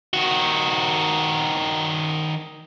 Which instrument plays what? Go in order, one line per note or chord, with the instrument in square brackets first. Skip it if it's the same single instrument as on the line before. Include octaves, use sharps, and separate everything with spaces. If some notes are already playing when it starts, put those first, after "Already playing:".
[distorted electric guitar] D#3 F#4